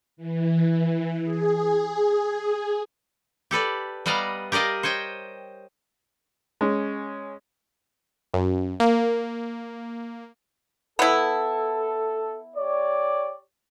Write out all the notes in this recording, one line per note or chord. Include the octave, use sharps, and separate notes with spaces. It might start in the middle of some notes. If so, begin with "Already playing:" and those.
E3
G#4
G4 A4 B4 D5
G3 B3 D5 D#5 F5 A#5
G4 A#4 D5 D#5 F5
C5 C#5 D#5 G5
G#3 C#4
F#2
A#3
B3 E4 A4
G4 C#5 D5